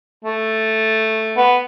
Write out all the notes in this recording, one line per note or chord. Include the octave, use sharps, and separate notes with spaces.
A3
B3